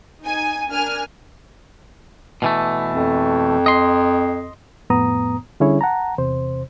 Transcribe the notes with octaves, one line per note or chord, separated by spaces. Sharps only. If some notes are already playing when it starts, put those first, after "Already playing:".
D#4 G#5
D4 A#4 G#5 F6
B2 E3 A3
F2
D#5 C6
F2 A2 B3 A#5 D#6
D3 G3 C#4 E4 G#4 C#5
F#5 A5 A#5
E2 C3 C5